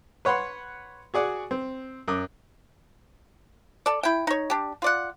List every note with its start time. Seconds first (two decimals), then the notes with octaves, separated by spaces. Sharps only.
0.25 B4 C#5 F#5 B5 C6
1.14 F#4 G#4 D5 F#5
1.51 C4
2.08 F#2 D6 D#6
3.86 A4 D5
4.03 E4 G5
4.27 D#4 C#5
4.50 D4 G4
4.82 F4 D5 F#5